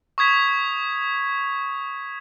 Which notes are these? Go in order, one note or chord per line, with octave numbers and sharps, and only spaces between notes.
C#6 D#6 G#6 B6